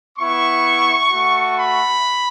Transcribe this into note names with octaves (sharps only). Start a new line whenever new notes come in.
B3 E4 C#6
A3 F#4
B5